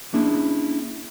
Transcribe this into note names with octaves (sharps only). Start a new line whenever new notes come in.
A#3 C#4 D4 E4 G#4